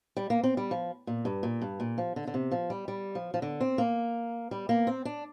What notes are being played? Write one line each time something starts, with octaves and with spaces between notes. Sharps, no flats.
G3
A#3
C4
G3
F3
A#2
G2
A#2
G2
A#2
F3
D3
D3
C3
F3
G3
G3
F3
F3
D3
C4
A#3
G3
A#3
C4
D4